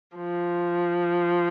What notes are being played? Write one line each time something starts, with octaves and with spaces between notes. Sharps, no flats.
F3